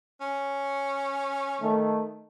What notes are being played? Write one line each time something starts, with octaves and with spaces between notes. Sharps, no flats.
C#4
D#3 A3